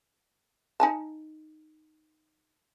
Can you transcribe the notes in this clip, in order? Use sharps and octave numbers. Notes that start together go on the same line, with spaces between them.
D#4 G#5 A5